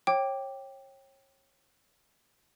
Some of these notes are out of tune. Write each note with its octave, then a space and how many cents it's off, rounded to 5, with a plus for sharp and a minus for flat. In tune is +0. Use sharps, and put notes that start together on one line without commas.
C#5 -30 G5 +0 D6 +0